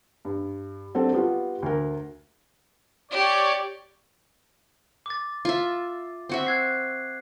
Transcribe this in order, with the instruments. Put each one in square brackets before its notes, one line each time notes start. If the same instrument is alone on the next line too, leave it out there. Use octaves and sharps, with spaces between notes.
[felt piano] G2
F#3 C4 D4 A4
G3 B3 F4 F#4
D2 A#4
[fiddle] G4 [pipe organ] C#5 D5
[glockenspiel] D6 A6
[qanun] F4 E5
C4 F#4 E5
[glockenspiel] F#6 G#6 C7